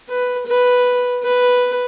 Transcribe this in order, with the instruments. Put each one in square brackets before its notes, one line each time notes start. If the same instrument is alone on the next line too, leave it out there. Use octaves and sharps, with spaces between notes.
[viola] B4
B4
B4